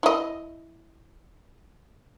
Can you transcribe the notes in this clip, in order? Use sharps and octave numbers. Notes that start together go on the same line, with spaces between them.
E4 D#5